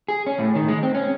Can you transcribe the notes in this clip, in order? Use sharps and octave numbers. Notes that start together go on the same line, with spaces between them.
G#4
C#4
A2
D#3
G#3
C4
C#4